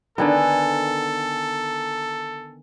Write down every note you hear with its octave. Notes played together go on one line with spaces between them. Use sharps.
D3 D#3 B3 A4 G#5 A#5